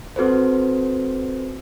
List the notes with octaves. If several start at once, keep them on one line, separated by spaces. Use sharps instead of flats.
C4 F#4 A4 B4 C5